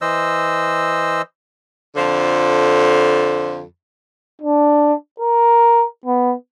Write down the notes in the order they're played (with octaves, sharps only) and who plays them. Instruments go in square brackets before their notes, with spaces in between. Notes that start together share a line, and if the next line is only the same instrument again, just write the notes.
[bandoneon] E3 C5 D#5 E6
[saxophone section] F2 D3 F3
[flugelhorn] D4
A#4
B3